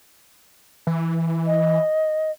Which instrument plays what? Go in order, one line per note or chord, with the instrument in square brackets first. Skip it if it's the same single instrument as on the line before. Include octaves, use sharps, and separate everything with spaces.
[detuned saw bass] E3
[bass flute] D#5